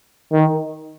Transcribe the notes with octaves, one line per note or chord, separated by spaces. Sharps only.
D#3